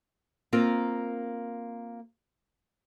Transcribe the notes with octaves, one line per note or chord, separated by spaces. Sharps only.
A#3 C4 F4 A#4